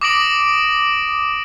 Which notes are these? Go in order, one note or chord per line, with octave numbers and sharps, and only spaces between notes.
D6 D#6 A#6 D7 F#7